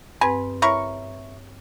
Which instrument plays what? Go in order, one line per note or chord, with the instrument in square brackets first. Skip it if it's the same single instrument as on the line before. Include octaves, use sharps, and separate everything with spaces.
[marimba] G2 C4 B4 [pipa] G#5
[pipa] E4 A#4 C#6 [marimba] C#5